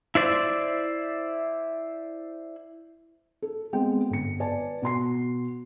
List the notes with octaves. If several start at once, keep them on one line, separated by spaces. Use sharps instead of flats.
E4 C5 D5
A4
G#3 B3 C4 G5
G1 C#7
B4 D5 G#5 A5
B2 F#4 C6 C7